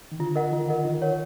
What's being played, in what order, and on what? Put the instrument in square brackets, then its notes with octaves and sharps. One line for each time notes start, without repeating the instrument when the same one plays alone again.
[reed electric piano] D#3
[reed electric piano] D3 [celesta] F4
[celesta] A#4 D#5 F#5
[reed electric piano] D#3 [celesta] F4
[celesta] A#4 D#5 F#5
[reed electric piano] D#3 [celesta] F4
[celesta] A#4 C#5 F#5